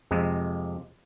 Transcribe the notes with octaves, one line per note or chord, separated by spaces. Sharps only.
F2 C3 G#3